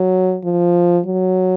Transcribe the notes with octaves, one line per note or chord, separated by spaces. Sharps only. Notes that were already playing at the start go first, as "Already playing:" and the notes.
Already playing: F#3
F3
F#3